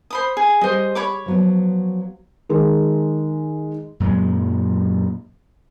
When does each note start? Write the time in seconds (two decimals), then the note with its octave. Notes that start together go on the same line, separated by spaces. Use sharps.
0.10 C5 B5 D#6
0.37 G#4
0.61 G3 G#4 C5 D#5
0.95 C#5 B5 D6
1.26 F3 F#3 B3
2.49 D#3 G#3
4.00 F#2 A#2 F#3 G#3